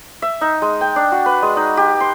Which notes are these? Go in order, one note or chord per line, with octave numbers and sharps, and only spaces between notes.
E5
D#4
G#3
G5
D4
F#4
B4
G#3
D#4
G4
C6